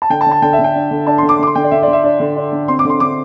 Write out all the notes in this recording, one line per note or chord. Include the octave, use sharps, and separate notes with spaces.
A5
D3 G5
A5
D3
A5
D3 G5
E5
D3
G5
D4
D3
D4 A5
C6
D3
D6
D3 D6
C6
D3 G5
D5
D3 E5
D5
D3
E5
D4 D5
D3
D4
D3
C4 C6
D6
D3 C6
D3 D6